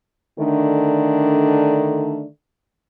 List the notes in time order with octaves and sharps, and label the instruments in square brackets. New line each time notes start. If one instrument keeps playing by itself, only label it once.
[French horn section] D3 D#3 A3 D4